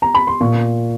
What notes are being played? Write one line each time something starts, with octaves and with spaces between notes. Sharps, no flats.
A#5
B5
C6
A#2 C#6